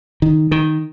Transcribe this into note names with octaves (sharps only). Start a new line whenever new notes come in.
D#3
D#3